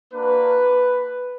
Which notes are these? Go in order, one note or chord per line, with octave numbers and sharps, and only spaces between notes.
A#3 D4 F#4 B4